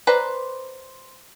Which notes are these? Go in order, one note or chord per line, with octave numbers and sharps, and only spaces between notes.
B4 C5 D5 A#5